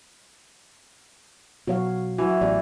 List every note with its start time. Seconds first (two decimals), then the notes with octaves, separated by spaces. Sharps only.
1.67 B2 F#3 F#4 C#5 F5
2.18 E3 F#3 E4 F#4
2.41 A1 B3 G4 D5